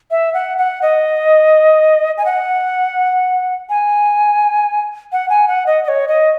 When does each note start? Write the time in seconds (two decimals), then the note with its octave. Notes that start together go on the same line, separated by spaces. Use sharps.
0.11 E5
0.34 F#5
0.58 F#5
0.82 D#5
2.17 G#5
2.25 F#5
3.69 G#5
5.12 F#5
5.30 G#5
5.48 F#5
5.67 D#5
5.84 D#5
5.88 C#5
6.08 D#5